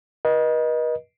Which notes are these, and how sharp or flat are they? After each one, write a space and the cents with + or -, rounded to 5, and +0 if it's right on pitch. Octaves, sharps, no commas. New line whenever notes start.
B4 -45 D#5 +0